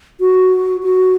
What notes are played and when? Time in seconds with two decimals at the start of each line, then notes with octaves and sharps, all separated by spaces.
0.20 F#4
0.83 F#4